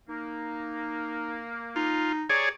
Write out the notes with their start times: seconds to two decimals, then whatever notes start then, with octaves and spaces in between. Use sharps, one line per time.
0.09 A#3 D#4
1.76 D#4 F4
2.30 G4 G#4 C#5 D5 A#5 C#6